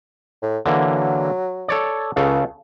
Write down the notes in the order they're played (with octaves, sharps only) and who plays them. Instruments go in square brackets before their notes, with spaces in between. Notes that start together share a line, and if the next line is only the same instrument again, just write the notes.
[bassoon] A2
[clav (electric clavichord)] D3 E3 A#3 [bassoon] F#3
[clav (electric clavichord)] A4 C#5 D5
[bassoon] C#2 [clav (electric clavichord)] C#3 A4 F5